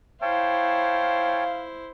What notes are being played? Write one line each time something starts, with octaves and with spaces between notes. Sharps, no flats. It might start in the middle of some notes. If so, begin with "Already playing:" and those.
E4 C5 C#5 F5 G5 A5